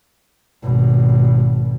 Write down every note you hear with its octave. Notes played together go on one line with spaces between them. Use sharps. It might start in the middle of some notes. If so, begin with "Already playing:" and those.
G#1 B2